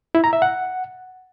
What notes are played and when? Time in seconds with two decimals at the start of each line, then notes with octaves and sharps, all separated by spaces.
0.15 E4
0.24 A#5
0.33 E5
0.42 F#5